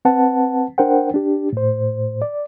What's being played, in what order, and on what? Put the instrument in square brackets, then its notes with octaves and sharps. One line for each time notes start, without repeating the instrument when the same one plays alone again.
[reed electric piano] C4 B4 F#5 A5
D4 A#4 C5 F#5 G5
D4 G4
A2 C5
D5